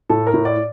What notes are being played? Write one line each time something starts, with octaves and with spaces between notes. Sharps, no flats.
A2 A4
A#4
A2
D5